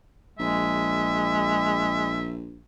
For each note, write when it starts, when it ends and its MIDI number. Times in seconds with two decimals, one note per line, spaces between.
0.39 2.63 34
0.39 2.22 56
0.39 2.34 76